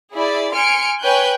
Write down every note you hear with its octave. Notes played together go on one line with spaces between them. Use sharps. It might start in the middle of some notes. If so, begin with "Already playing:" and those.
E4 G#4 D5 B5
G#5 C6 F6 C#7 D7
B4 C#5 G5 G#5 F#6 G6